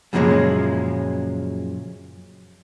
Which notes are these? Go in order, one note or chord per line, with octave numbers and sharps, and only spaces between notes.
F#2 A#2 C#3 F3 F#3 G#3